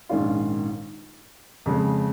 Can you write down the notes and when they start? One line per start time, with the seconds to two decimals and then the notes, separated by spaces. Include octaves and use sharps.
0.09 A#1 G#2 D#3 C#4 F4
1.66 F2 C#3 G#3